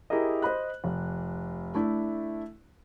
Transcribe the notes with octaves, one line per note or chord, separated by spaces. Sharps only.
E4 G4 G#4 A#4 D#5
C5 D#5 B5 F#6
F1
A3 D4 E4